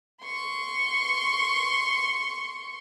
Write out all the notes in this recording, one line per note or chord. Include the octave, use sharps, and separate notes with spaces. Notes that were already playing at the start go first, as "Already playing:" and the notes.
C6 C#6